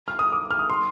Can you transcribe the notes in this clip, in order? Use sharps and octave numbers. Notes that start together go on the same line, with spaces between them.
F6
D#6
D6
F6
D#6
C6